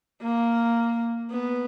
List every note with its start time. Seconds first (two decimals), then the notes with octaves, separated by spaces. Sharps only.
0.22 A#3
1.31 B3